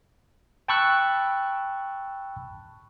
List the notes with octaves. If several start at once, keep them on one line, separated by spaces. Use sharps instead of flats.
G5 A5 B5 C#6 E6 F#6